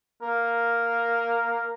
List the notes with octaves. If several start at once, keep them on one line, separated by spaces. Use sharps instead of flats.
A#3 A#4